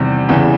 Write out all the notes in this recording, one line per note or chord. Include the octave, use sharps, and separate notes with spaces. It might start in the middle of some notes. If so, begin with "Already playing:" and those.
Already playing: E2 C3 D#3 G3
E2 C#3 E3